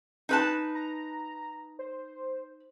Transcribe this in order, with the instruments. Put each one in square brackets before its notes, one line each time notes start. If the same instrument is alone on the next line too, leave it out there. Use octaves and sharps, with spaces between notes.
[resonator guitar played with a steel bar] D#4 B4 A5
[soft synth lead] A#5
C5